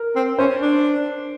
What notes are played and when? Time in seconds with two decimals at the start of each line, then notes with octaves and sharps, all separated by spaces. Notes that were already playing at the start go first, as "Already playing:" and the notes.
Already playing: A#4
0.16 C4
0.38 C#4 C5
0.61 D4